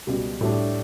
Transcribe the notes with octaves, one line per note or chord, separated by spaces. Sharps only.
C#2 B2 G3
A2 G3 D4